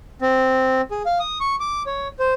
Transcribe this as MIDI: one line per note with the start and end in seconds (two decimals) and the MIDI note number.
0.22 0.81 60
0.91 1.03 68
1.06 1.19 77
1.20 1.38 87
1.41 1.56 85
1.60 1.83 86
1.86 2.08 73
2.19 2.34 72